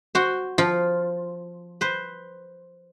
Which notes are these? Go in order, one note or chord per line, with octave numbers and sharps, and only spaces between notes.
F#4 C5
F3 F4
B4 C5